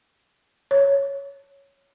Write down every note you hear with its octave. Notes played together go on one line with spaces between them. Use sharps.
C#5